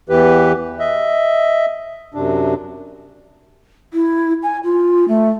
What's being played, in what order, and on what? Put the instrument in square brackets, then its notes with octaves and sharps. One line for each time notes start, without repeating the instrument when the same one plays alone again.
[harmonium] E2 E3 G4 B4
D#5 E5
F#2 C3 D4
[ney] E4
G#5
F4
A3